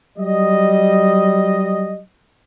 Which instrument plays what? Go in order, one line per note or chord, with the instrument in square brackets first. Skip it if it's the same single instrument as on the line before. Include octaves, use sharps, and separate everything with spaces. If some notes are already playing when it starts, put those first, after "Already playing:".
[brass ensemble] F#3 G3 D#5